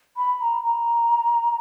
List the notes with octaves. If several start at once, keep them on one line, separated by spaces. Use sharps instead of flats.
B5
A#5
A#5